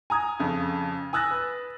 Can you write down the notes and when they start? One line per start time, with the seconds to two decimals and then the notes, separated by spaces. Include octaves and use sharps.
0.10 G#5 A#5 D#6 G#6
0.39 F2 C#3
1.13 G#5 D#6 E6 F#6 A6 A#6
1.31 B4